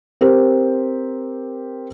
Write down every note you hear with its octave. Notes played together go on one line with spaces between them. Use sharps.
C4 G4 A#4 C5